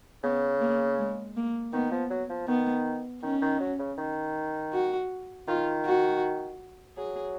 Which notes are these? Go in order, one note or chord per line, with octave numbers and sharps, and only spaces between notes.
C#3 B3
A#3
G#3
A#3
D#3 B3
F3
F#3
F3
D#3 B3
D#3 C#4
D#3
F#3
C#3
D#3
F#4
D#3 F4
F#4
F#3 G#4